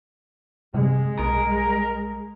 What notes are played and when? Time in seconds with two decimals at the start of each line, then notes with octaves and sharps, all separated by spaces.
0.74 C3 G#3
1.19 B1 A#4